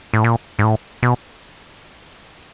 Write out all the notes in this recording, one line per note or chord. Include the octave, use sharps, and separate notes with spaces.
A2
A#2
G#2
A2
B2